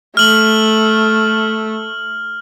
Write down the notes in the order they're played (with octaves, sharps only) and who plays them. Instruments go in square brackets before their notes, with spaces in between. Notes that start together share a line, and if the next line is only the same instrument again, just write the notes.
[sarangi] A3 [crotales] F6 F#7